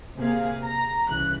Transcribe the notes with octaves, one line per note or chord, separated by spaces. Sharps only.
C3 A#3 G#4 F5
A#5
C2 C#3 E3 F#6